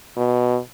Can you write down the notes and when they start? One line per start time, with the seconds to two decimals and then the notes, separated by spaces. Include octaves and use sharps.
0.16 B2